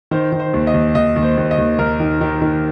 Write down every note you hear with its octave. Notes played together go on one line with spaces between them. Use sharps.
D#3 C5
D#3
C5
D#2
D#5
D#2
D#2 D#5
D#2
C5
D#2
D#5
D#2
D#2 A#4
D#3
D#3
D#3